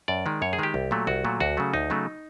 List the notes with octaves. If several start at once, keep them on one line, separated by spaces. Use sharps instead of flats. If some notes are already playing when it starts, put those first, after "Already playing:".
F#2 D5
D#3 G#3
F#2 C#5
G#4
D#3 G#3 G4
C2
A#2 F#3 A3
C2 F#4
A#2 F#3 A3
D2 F#4
C#3 F#3 A3
D2 D#4
C#3 F#3 A3